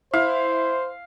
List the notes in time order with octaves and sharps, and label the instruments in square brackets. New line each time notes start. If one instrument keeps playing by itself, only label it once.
[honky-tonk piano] E4 [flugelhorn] C5 [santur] F5